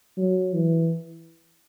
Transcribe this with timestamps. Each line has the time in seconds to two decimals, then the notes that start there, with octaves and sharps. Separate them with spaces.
0.17 F#3
0.54 E3